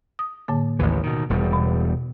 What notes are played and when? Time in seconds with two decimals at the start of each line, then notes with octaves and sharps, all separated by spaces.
0.19 D#6
0.48 A2 D3 A#3
0.79 A1 D#2 E3
1.03 B2 D#3
1.30 E1 E2 G3
1.53 B2